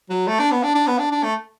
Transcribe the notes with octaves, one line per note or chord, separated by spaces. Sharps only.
F#3
A3
D4
B3
D4
D4
B3
D4
D4
A3